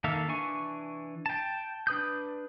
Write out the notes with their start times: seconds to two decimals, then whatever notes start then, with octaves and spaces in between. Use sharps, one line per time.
0.04 D#3 A#3 A4 E5 F5
0.28 E3 D4 G#5 C#6
1.26 G5 A5
1.87 D4 B4 D#6 G6